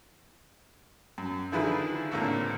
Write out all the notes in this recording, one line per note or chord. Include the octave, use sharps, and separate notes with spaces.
F#2
D3 D#3 F3 E4 G#4 B4
C#2 A2 D3 A3 A#3 C4